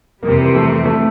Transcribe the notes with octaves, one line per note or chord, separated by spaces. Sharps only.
F2 C3 E3 G3 A#3
A3
A3